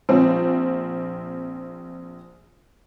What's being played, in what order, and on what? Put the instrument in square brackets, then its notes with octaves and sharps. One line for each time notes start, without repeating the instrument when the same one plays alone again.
[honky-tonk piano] A#1 C4